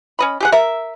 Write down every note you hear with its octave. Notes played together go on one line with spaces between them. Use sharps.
C#4 D#5 B5
G4 G#4 F#5
A#4 E5